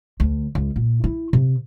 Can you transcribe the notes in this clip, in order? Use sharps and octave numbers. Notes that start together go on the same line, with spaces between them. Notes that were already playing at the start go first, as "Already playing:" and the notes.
D2
C#2
A#2
E4
C3